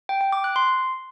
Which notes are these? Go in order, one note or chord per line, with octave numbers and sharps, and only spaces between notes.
G5
G5
D6
F#6
C6